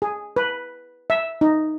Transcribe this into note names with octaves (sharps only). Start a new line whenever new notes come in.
G#4
B4
E5
D#4